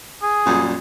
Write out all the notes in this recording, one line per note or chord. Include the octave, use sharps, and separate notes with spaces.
G#4
F#2 A#2 G3